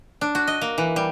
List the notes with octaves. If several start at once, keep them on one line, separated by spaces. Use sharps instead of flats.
D4
F#4
D#5
A#3
E3
G3